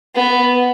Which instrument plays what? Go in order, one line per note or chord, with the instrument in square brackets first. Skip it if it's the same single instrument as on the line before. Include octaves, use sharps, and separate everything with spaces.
[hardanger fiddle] B3